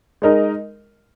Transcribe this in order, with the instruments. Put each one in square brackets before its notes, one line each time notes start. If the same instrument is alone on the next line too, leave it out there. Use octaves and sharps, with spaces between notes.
[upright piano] G#3 D#4 A#4 D#5